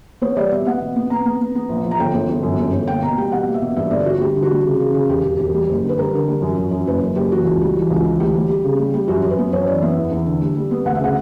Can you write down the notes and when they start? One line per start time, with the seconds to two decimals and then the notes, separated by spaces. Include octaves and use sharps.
0.21 B3 C#5
0.37 G3 D5
0.51 B2 E5
0.67 B3 F#5
0.81 B2
0.96 B3
1.10 B3 A#5
1.26 B3
1.41 B3
1.55 B3
1.69 A#1
1.84 A#1
1.91 A#5
2.00 G1 G5
2.14 G1
2.29 G1
2.43 F#2
2.59 G1
2.73 G1
2.88 A#3 G5
3.03 B2 A#5
3.18 G3 G5
3.32 B2 F#5
3.47 A#3
3.54 E5
3.62 B2
3.77 G2 E5
3.91 G1 D5
4.06 D3 F#4
4.21 G3 G4
4.36 D3
4.42 F#4
4.51 G3
4.65 C#3
4.80 C#3
4.94 C#3
5.09 E1 G4
5.24 E1
5.39 E1
5.54 G3
5.69 F#1
5.84 D3
5.89 B4
5.98 G3 A#4
6.13 D3
6.28 G3
6.42 F#2
6.58 F#2
6.71 F#2
6.87 F#1 B4
7.01 F#2
7.16 F#1 G4
7.31 E3 F#4
7.45 C#2
7.61 G3
7.76 E3
7.90 C#2
8.05 E3
8.20 D2 G4
8.35 G3
8.50 G3
8.64 C#3
8.79 G3
8.94 G3
9.08 F#2 F#4
9.23 F#2
9.30 B4
9.39 B3
9.52 F#2 C#5
9.67 E3 D5
9.82 B3 E5
9.97 E2
10.11 E2
10.26 D3
10.41 G3
10.56 G3
10.71 B3
10.85 D2 F#5
10.95 E5
11.00 C#3 F#5